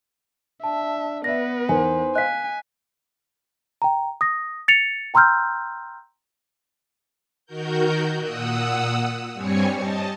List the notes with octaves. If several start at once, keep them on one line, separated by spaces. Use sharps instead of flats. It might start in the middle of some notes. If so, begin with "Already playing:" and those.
D4 E5 A5
B3 B4 D5 E5 A#6
E2 D#4 A#4 C5 G#5
D#5 F5 G#5 F#6 B6
G5 A#5
D#6 A#6
A6 C#7 F7
G5 A#5 C6 E6 F6 G6
D#3 F#4 A#4 G6
A#2 F#5 D#6 E6
G2 G3 C4 C#5 G#5 C#7
D#5 A5